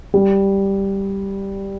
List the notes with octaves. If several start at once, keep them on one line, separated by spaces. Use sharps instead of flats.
G3